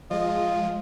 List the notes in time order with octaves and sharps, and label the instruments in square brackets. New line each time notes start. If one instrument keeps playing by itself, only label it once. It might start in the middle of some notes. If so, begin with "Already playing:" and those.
[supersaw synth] F3 G#3 [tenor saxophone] F4 [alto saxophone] D#5